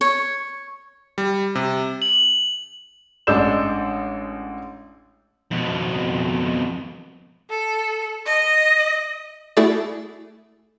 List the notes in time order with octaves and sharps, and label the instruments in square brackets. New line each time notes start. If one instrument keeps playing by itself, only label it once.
[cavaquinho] C#5
[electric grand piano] G3
C3
[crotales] F#7
[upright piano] A1 G#3 D4 E6 G6 E7
[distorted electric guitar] F2 B2
[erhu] A4
D#5
[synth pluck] A3 E4 F#4 G#4 A4 D5